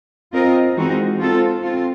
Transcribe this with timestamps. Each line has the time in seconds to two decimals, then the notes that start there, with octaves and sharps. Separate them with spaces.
0.33 C4 F4 A#4 D#5
0.76 E3 G#3 C4 D#4 F#4
1.20 C4 F4 A4
1.63 C4 F4